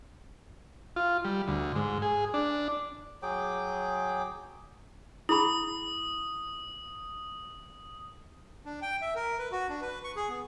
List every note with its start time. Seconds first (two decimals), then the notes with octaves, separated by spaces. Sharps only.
0.96 F4
1.25 G3
1.48 D2
1.76 G#2
2.02 G#4
2.34 D4
3.23 F#3 G#4 G5 D6
5.29 E4 G#4 B5 D#6
8.65 D4
8.82 G5
9.02 E5
9.15 A#4
9.39 B4
9.52 F#4
9.69 D4
9.82 B4
10.04 C#6
10.16 G#4
10.29 B3